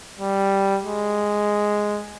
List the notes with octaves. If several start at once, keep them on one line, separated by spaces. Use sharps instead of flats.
G3
G#3